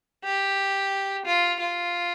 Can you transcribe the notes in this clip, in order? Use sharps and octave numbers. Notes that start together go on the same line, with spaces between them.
G4
F4
F4